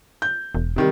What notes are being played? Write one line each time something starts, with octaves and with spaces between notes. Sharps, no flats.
G6
E1
C3 D#3 G3